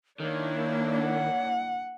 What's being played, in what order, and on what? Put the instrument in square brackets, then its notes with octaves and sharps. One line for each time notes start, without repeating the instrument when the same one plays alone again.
[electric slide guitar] D#3 [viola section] A#3 D4 E4 [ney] C#5
[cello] F#5